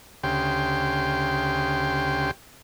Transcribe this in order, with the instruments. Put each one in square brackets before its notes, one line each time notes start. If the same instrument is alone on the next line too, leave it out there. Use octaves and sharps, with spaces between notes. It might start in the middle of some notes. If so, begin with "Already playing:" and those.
[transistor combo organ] D2 C#3 G4 G5 C6